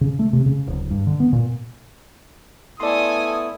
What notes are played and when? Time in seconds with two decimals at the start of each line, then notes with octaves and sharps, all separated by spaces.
0.01 C#3
0.19 A3
0.33 C3
0.46 C#3
0.67 D1
0.91 G2
1.07 D3
1.20 B3
1.33 A#2
2.80 A3 B3 E4 A4 D5 G#5 C6 D#6